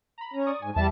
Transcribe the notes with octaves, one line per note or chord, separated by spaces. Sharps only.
A#5 B5
C#4 A#5
D5 C#6 D#6
G#2 G#5
E2 G3 E5 A5